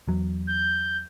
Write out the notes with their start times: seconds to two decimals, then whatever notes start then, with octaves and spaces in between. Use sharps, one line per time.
0.08 E2 F#3
0.47 G6